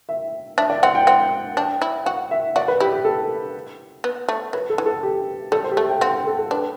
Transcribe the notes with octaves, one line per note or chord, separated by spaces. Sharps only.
E5
D4 E5
D5
C4 F#5
G5
C4 F#5
D4 G5
E4
F#4 F#5
E5
F#4 D5
B4
E4 G4
G4
A4
B3
A3
F#3 B4
A4
E3
A4
G4
G3 A4
C5
G4
A3 A4
G5
C4 F#5
A4
A4
D4 B4